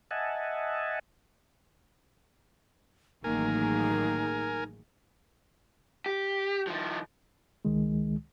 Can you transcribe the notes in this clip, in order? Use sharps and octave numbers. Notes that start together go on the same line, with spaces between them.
D#5 E5 F#5 G#5 A5
A1 D#3 F#3 A#3 D#4 G#4 A#4 G#5
G4
D#3 F3
C#2 D#3 G#3